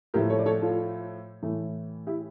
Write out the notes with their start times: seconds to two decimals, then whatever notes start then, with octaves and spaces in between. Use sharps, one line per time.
0.14 A2 F3 A3 G4 A#4
0.30 A4 C#5
0.39 D5
0.46 A4 C#5
0.62 F4 A4
1.43 A2 E3 A3
2.07 E4 G4